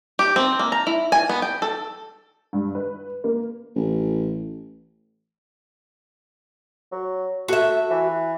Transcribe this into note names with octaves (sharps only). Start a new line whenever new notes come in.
G4
C4
A#3
A#5
E4
G#5
B3
G5
A4
G2
B4
A#3
A1
F#3
A3 F#4 E5
E3